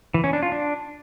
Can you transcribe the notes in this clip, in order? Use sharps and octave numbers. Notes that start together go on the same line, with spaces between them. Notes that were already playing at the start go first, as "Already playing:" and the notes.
E3
C#4
D4
F4
D4